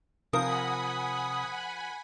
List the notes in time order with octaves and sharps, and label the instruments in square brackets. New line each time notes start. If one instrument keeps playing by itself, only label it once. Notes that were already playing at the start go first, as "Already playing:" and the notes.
[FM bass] C3 [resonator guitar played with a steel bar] F3 A#4 [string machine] F#5 G#5 B5 [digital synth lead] D#6